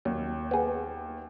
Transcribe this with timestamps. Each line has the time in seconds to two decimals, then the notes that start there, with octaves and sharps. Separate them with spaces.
0.05 D#2 F#3
0.51 B3 G#4